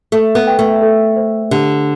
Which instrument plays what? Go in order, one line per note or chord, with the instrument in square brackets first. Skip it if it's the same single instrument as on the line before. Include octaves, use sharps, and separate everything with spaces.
[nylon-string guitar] A3 [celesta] A4
[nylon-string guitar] B3
[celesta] G5
[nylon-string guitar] A3
[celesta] A4
C5
[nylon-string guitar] D3 [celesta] G4